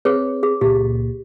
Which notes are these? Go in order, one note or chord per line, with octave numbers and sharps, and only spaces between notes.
C4 G#4 B4 C#5
G#4
C#2 A#2 G4